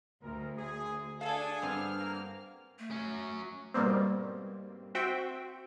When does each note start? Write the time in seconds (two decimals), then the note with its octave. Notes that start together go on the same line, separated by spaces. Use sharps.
0.23 D2 A#4
0.56 G#4
1.21 D4 G#4 A4 F5 G#5
1.62 G2 B3 C4 F6
1.98 A#3
2.79 A3
2.91 F#3 C#4
3.74 G#2 B2 G3 A#3 C4
4.95 C4 F#4 E5 G5